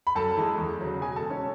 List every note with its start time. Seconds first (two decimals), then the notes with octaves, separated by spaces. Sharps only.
0.07 B5
0.15 F#2 A4 A5
0.37 E3 G#3
0.58 E2
0.81 C#3 F#3
1.01 B2 G#4 G#5
1.16 A4 A5
1.23 G#3
1.30 C#4 C#5